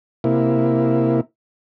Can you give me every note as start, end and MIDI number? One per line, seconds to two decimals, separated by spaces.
0.24 1.21 48
0.24 1.21 58
0.24 1.21 64